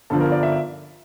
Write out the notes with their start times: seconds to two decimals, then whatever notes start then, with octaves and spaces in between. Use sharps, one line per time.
0.10 G1 G2 D3 F3 A4
0.20 A#4
0.32 D5
0.43 E5